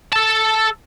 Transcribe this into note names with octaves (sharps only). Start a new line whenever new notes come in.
A4 A5